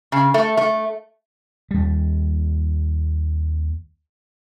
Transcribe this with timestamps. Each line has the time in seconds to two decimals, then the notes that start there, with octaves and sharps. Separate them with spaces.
0.12 C#3
0.34 A3
0.57 A3
1.71 D#2 G3